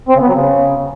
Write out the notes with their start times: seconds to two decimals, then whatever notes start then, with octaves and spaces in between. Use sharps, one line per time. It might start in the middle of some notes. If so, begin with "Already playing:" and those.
0.09 C4
0.15 C#3
0.21 B3
0.28 F#3
0.34 C#3